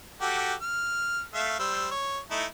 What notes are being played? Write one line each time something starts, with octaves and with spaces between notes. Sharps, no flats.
F#4 G4 A4
F6
A3 E5 F5
G3 C5 E6
C#5
A3 D#4 E4